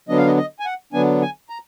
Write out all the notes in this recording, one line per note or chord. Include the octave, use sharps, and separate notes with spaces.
D3 F#3 B3 D4 D#5
F5
D#5
D#5
G#5
F#5
D3 F#3 B3 D4 G#5
G#5
A#5